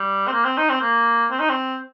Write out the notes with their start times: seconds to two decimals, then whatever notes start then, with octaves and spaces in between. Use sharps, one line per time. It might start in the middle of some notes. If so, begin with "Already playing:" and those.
Already playing: G3
0.28 C4
0.33 A#3
0.45 C4
0.57 D#4
0.70 C4
0.81 A#3
1.31 C4
1.39 D#4
1.49 C4